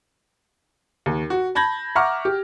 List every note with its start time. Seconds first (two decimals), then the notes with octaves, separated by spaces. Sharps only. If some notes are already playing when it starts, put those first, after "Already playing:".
1.06 D#2
1.30 F#4
1.55 A5 B5 G6 G#6 A#6 F#7
1.95 E5 F#5 A#5 C#6 D6 F6
2.25 G4